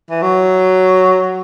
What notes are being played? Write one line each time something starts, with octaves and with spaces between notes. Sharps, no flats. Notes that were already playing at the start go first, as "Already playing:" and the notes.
E3
F#3